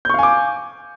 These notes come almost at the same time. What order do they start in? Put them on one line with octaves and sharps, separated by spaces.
G6 C#6 F5 G#5 D6